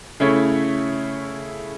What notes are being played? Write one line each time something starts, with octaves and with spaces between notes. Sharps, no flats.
C#3 A3 E4 C#5